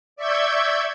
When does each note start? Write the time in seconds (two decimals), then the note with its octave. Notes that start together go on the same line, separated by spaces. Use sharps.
0.16 D5 E5 C#6 E6 G6 G#6